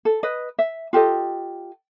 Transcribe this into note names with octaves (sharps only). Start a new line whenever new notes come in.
A4
B4 D#5
E5
F4 G4 A4 D#5